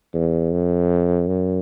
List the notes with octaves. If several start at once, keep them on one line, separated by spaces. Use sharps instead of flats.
E2
F2
F#2